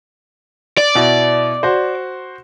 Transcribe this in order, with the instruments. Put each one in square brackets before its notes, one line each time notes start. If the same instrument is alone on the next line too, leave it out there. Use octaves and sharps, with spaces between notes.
[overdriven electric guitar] D5
[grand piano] B2 E4
F#4 C5